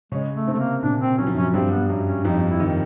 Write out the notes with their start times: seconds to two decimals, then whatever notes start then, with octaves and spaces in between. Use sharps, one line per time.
0.12 C#3 G#3 C#4
0.35 A3
0.47 C3 C4
0.53 A3
0.60 A#3
0.83 A#2 A#3 D4
1.01 C4
1.18 F#3 C#4
1.27 F3
1.35 F#2 F#3 C#4
1.54 G2 G3 C4
1.71 B3
1.89 F#2 F#3
2.07 C#4
2.25 F2 F3 D#4
2.48 E4
2.60 D#3